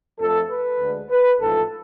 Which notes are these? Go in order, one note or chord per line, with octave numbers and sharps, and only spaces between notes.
F2 F3 A3 A4
B4
D2 D3 G#3
B4
A1 G#2 F3 A3 A4